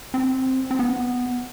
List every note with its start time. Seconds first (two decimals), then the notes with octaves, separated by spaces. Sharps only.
0.14 C4
0.71 C4
0.79 B3